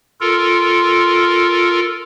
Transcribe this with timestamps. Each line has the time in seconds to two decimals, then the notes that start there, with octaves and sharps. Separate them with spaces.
0.21 F4 A4 A#4